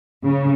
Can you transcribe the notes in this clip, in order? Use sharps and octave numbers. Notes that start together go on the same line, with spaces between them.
C#3